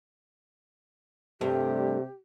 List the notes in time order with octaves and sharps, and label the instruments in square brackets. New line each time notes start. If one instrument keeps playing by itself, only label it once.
[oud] G2 A3 [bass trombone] C3 [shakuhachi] G4